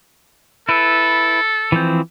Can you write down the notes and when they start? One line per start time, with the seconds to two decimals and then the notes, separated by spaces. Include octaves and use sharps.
0.69 E4 A4 B4
1.72 E3 F3 C4